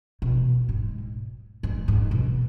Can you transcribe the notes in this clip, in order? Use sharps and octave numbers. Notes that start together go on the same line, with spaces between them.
B2
G#2
G#2
G#2
B2